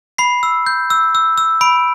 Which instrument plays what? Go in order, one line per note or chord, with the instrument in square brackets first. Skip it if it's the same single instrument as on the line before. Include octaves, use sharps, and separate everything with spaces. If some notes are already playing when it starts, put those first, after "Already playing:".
[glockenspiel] B5 C7
E6
G6
E6
E6
E6
B5 D7